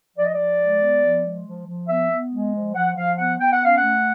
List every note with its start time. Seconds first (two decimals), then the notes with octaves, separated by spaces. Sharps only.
0.17 F3 D5
0.25 D#5
0.34 F3 D5
0.59 G#3
0.81 B3
1.03 F3
1.24 G#3
1.46 F3
1.67 F3
1.88 B3 E5
2.10 B3
2.32 G#3
2.53 F3
2.75 F3 F#5
2.96 F3 F5
3.18 B3 F#5
3.39 B3 G5
3.52 F#5
3.61 C#4 F5
3.77 A3 F#5